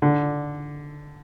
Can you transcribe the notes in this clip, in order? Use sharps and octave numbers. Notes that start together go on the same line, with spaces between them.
D3